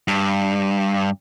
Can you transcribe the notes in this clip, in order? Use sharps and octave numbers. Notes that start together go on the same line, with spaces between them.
G2